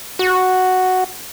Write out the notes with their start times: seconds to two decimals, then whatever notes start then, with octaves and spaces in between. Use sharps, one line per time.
0.19 F#4